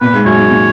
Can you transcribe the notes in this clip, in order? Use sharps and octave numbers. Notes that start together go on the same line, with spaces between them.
A#2 B4
G#2
F#2 C#5
G#2
A#2